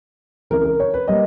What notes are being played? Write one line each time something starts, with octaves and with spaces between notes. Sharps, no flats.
C#2 C#3 E3 A#4
A#4
C#5
B4
G3 A#3 D#5